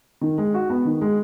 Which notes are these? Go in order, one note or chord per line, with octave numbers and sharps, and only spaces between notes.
D#3
G#3
F#4
B3
D#3
G#3